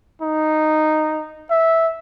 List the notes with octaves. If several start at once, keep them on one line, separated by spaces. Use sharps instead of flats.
D#4
E5